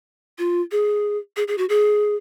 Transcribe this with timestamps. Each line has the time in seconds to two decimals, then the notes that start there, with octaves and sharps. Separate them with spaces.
0.38 F4
0.72 G#4
1.37 G#4
1.48 G#4
1.58 F#4
1.69 G#4